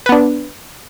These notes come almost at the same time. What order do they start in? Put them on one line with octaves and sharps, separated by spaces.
B4 B3 D4